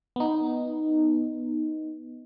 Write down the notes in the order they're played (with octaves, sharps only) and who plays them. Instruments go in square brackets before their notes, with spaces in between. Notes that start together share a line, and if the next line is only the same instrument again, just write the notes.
[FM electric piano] B3 D#4